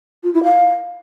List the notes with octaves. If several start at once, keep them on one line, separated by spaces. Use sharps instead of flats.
F4
E4
F5